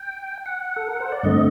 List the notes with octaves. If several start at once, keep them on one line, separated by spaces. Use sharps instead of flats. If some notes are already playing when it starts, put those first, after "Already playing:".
Already playing: G5
F#5
A4
A#4
C5
D5
G2 D3 A3 C4 D#5